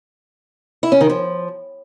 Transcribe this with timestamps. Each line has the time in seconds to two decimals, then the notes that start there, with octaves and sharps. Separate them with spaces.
0.83 E4
0.92 C#4
1.01 D#3
1.09 F3